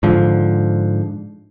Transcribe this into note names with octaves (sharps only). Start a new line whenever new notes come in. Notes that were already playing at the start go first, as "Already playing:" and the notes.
G#2 D3 F3